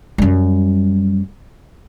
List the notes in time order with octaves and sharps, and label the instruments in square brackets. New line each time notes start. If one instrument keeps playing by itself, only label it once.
[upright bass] F#2 G3